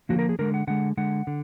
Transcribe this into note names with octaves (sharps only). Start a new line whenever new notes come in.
D3 F3 A#3 F#4
A#4
G#4
D3 G#3 A#4
F#5
D3 G#3 F#5
D3 G#3 F#5
D3